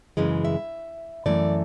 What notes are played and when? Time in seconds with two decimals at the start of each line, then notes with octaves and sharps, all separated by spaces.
0.17 F#2 C#3 E3 G#3
0.45 E5
1.26 F#2 E3 A3 D5